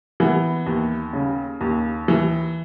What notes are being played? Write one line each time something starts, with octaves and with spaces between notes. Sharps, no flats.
E3 B3
D#2
C#3
D#2
E3